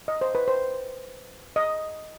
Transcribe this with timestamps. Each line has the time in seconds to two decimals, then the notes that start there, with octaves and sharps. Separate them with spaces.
0.08 D#5
0.21 C5
0.35 B4
0.48 C5
1.56 D#5